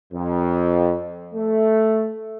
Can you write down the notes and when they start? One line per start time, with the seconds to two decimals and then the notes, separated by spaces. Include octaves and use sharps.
0.14 F2
1.34 A3